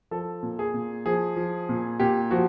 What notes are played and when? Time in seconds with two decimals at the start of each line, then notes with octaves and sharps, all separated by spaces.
0.11 F3 A4
0.43 A#2
0.59 G#4
0.74 A#2
1.06 F3 G#4
1.36 F3
1.69 A#2
2.00 A#2 G4
2.31 F3 F#4